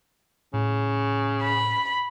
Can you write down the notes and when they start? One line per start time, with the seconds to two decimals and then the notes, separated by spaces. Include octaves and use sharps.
0.54 A2 C#3
1.43 B5